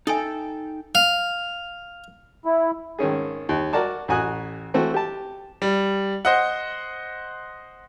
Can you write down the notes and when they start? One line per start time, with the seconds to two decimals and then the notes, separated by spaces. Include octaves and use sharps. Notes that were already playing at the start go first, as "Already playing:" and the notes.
0.07 D#4 A4 E5 G5 G#5 D#6
0.95 F5
2.45 E4
2.99 G#1 D#3 C#4 G#4
3.49 D#2
3.73 F#4 A#4 D5 A5 D6
4.08 A1 F#4 G#5 D#6 F#6
4.74 E3 A3 C4 F#4
4.94 G4 A5
5.62 G3
6.25 C5 D#5 F#5